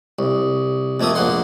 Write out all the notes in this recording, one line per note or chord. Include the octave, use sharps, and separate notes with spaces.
C2
F2 A3 A#3 E5 D#6
A#1 A#3 F#5 C6